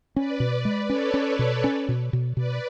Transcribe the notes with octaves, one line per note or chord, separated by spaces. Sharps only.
C#4 B4 D5
B2
G#3
C#4 A4 C#5
C#4
B2
C#4
B2
B2
B2 B4 D5